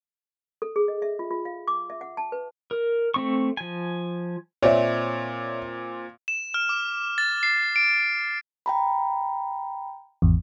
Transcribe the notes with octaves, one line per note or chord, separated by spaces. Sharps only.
A4
G#4
D#5
E5
F4
F4
F5
D6
E5
F#5
A5
B4
A#4
A3 C4 C#6
F3 G#5
A#2 C4 C#5 D5 E5
E7
F6
D6
A6
C7
D7
G5 A#5 B5
G#1 E2